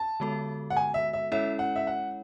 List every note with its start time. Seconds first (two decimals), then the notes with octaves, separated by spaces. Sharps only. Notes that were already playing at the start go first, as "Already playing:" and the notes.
Already playing: A5
0.20 D3 G#3 B3 F#4 A4
0.70 F#5
0.76 G#5
0.94 E5
1.13 E5
1.32 G#3 C#4 E4 A4 C#5 E5
1.59 F#5
1.76 E5
1.87 F#5